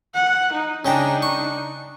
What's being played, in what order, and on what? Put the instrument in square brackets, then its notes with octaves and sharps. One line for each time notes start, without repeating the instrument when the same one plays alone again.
[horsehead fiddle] F#5
D#4
[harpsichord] C#3 G5 A#5 [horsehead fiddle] D4 D#4
[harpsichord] C#6